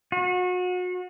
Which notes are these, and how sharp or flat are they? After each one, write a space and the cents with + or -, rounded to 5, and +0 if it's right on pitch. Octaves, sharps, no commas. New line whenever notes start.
F#4 -35